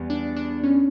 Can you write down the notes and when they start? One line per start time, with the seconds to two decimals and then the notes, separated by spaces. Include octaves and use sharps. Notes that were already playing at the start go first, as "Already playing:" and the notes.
Already playing: E2 G3 B3
0.10 D4
0.36 D4
0.63 C#4